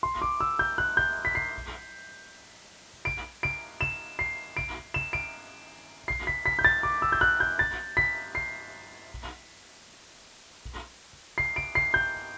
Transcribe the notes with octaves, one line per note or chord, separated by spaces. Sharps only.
C6
D6
E6
G6
F#6
G6
B6
C7
D7
D7
E7
C7
D7
E7
D7
C7
B6
B6
G6
A6
D6
E6
G6
F#6
G6
A6
B6
C7
C7
D7
C7
G6